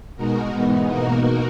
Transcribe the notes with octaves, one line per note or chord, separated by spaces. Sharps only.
B2 G#3 D#4 F#4 A#4
G#2 E3 G#3 B3 D#4
B2 A#3 D#4 F#4 A#4